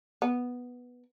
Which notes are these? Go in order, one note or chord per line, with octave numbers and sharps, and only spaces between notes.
B3